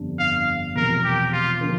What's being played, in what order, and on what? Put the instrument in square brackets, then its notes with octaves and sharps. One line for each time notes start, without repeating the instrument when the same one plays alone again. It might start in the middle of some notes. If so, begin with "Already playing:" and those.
Already playing: [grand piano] G1 F2 D3 G3 D4
[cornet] F5
[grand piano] E1 E2 C3 F3 [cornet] A#4
[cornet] G4
F4
[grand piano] D3 F3 A#3